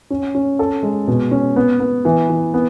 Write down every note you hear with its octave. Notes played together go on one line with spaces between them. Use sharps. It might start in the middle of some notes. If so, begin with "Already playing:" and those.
C#4
C#4
A4
G#3
B2
C#4
B3
B3
E3
E3
B3